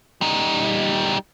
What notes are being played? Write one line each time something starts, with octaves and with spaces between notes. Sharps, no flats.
G3 D#4